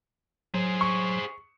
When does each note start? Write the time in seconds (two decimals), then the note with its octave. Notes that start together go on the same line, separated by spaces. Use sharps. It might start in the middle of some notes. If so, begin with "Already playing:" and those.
0.54 F#3 G#4 C5
0.81 C#6